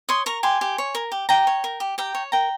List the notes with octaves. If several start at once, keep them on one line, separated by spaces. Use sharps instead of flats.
C#5 C6 D#6
A#4 A#5 C#6
G4 G#5 C6
G4
C#5
A#4
G4
G4 G5 A#5
C#5
A#4
G4
G4 G5 A#5
C#5
A#4 G5 A#5